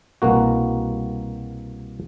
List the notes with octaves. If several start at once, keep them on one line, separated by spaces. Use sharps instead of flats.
C2 B2 A#3 F#4